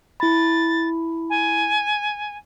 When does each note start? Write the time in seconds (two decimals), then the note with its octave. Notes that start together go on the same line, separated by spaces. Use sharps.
0.20 E4 B5 A6
1.29 G#5